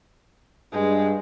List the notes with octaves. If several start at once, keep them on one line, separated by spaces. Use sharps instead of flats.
G2 G#3